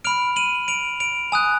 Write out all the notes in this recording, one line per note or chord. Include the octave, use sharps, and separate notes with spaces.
B5 F6 D7 F7
D#7 F#7
D7 F7
D7 F7
G#5 D#6 F#6